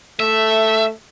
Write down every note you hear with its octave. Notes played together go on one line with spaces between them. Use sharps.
A3 E5